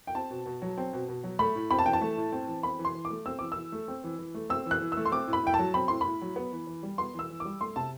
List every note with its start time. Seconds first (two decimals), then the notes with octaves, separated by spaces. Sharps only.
0.07 G5
0.15 C4 A5
0.31 B2
0.46 B2
0.62 F#3
0.78 C4
0.93 B2
1.08 B2
1.24 F#3
1.39 A3 B5
1.55 A2
1.71 C4 B5
1.79 A5
1.86 E3 G5
1.93 A5
2.01 A3
2.17 A2
2.32 C4
2.48 E3
2.63 C4 B5
2.79 E3
2.85 C6
2.95 E3
3.05 D6
3.10 A3
3.26 C4 E6
3.39 E3 D6
3.52 E6
3.57 E3
3.72 A3
3.88 C4
4.04 E3
4.19 E3
4.34 A3
4.50 C4 E6
4.66 E3
4.71 F#6
4.81 E3
4.92 A3 E6
5.05 C6
5.12 C4 D6
5.28 A2
5.33 B5
5.43 A2 G5
5.54 A5
5.59 F#3
5.74 C4 B5
5.88 A2 C6
6.01 A2 B5
6.22 F#3
6.36 B3
6.52 E3
6.67 E3
6.83 G3
6.98 B3 C6
7.14 E3 E6
7.30 E3
7.40 D6
7.45 G3
7.60 A3 C6
7.76 C3 A5